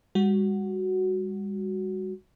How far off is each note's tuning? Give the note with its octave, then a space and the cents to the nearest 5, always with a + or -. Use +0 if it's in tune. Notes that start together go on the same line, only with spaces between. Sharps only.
G3 +45 F#4 +5